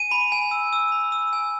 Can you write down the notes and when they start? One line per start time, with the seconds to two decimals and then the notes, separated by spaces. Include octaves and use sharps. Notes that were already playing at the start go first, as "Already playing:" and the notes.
Already playing: G#5 D#7
0.11 B5
0.32 G#5
0.51 E6
0.73 E6
0.92 B5
1.12 E6
1.33 G#5